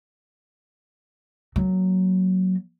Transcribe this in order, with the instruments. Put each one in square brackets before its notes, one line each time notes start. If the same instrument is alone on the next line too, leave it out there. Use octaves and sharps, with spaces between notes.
[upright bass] F#3 A#3